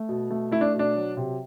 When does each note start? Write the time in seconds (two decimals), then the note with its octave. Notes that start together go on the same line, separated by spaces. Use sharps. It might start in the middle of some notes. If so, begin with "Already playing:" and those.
Already playing: A3
0.09 B2
0.31 A3
0.51 A3 E4
0.61 D4
0.74 B2
0.79 D4
0.95 F#3
1.17 C3